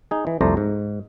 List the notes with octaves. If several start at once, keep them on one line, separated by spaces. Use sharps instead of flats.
D#4 G#4
E3
C2 F2 A3 C5 D5 A#5
G#2